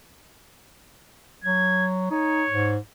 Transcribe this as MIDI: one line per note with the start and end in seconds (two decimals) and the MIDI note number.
1.44 2.06 54
1.44 1.87 92
2.11 2.44 63
2.11 2.74 73
2.49 2.77 44